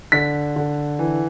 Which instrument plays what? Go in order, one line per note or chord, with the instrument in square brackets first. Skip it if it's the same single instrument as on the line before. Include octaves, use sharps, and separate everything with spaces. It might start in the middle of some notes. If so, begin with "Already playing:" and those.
[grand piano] D3 B6
D3
E3